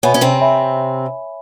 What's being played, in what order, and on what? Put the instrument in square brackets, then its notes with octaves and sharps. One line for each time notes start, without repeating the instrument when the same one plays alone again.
[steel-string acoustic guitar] B2 B3 [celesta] C#5 E5 G#5 B5
[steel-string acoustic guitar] C#4
C3 C4
[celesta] C#5 E5 G#5 B5